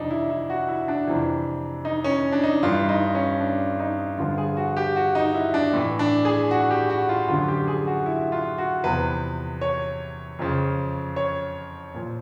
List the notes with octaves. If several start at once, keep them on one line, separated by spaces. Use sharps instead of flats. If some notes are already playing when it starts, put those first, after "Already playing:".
Already playing: F2 C3 E3 D4 D#4
E4
E4
F#4
E4
D4
F2 C3 E3
D#4
C#4
D4
D#4
G2 E3 F4
D#4
C#4
D4
D#4
G2 D3 F3 F4
G#4
F#4
G4
F#4
D#4
E4
D4
A2 E3
D4
G#4
F#4
G4
F#4
F4
F#2 D3 F3 F4
G4
G#4
F#4
E4
F4
F#4
E2 C3 F3 B4
C#5
F2 C#3 F3
C#5
A#2 F3